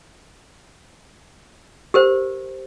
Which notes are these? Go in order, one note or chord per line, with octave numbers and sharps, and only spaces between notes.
G4 A#4 C5